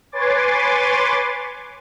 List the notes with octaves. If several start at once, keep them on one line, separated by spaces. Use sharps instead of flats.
B4 C#5 G#5 C6 D6 A6